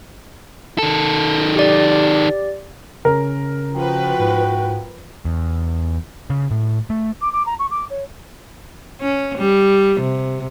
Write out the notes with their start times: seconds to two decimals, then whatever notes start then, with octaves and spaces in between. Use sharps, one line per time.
0.78 D#3 A4
1.56 G4 D5
3.05 C#3 C#4 A#4
3.75 F3 F#4 B4 G5
4.20 G#2
5.25 E2
6.30 C#3
6.51 A2
6.90 A3
7.21 D6
7.33 D6
7.46 A#5
7.59 C#6
7.71 D6
7.90 C#5
9.01 C#4
9.38 G3
10.00 C3